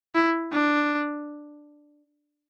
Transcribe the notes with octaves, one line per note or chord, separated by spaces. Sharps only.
E4
D4